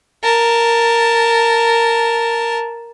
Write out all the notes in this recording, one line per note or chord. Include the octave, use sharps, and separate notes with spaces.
A#4 A5